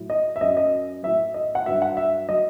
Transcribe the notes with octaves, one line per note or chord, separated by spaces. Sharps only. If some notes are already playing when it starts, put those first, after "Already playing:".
Already playing: A2 F#3
D#5
E5
F#2 F#3 D#5
D#5
A2 F#3 E5
D#5
F#5
G2 F#3 E5
F#5
E5
F#3 D#5